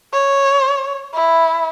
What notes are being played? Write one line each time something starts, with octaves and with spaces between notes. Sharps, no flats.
C#5
E4